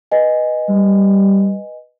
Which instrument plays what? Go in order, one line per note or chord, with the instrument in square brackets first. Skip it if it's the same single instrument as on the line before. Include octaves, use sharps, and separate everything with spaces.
[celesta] B4 D#5 G#5
[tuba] G3